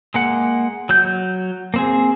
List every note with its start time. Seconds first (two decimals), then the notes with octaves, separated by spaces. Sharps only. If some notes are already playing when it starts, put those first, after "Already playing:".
0.14 G#3 A#3 F#5
0.89 F#3 G6
1.74 A#3 C4 G#4